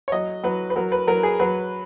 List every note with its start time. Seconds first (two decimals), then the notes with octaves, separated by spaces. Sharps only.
0.08 C#5
0.12 F#3 D#5
0.43 F#3 B4
0.70 B4
0.76 F#3 A#4
0.92 B4
1.07 F#3 A#4
1.23 G#4
1.40 F#3 B4